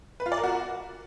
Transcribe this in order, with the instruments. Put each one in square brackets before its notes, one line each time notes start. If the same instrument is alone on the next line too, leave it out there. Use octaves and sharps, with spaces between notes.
[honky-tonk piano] B4
F4
D5
A#4
F#4